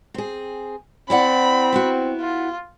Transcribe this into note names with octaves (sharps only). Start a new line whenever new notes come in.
C4 G#4
C4 E4 D5 F#5 B5
B3 E4 F#4
F4